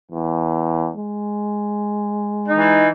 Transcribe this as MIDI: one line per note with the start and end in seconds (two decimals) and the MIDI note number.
0.12 0.91 40
0.97 2.86 56
2.49 2.87 52
2.49 2.87 63